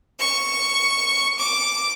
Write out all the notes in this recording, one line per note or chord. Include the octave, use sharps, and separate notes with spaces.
C#6
D6